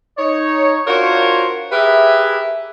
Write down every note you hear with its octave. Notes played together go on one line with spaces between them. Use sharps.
D#4 C#5
D4 F4 F#4 A#4 C5 C#5
G4 G#4 A#4 B4 E5